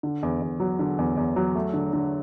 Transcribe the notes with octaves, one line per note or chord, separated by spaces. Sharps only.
D3
E2
E2
F#3
D3
E2
E2
F#3
A3
D3
D3